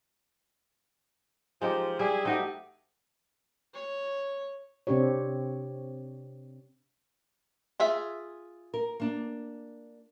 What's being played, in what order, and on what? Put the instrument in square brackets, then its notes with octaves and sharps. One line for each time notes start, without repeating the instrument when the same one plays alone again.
[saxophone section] F3 [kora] G#3 D#4 G4
[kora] G3 [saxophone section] E4 G#4
[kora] A3 F#4 G4 [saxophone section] C4 D#4
[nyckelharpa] C#5
[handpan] C3 C4 D4 G4 C#5
[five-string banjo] F4 G#4 E5
[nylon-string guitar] A#4
A#3 D4